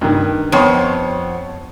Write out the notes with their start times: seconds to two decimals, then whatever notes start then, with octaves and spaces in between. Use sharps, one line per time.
0.01 G2 D#3
0.52 F2 B3 C#5 G5 C6 C#6